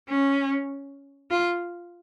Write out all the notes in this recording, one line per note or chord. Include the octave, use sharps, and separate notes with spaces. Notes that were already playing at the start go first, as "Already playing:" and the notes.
C#4
F4